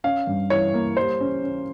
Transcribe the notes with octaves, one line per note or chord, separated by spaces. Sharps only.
C#4 F5
G2
E3 C#5
A#3
G3 C5
C#4
C#4